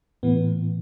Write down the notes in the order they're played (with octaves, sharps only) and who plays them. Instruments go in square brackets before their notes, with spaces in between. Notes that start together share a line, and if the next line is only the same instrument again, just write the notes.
[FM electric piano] A2 E3 B3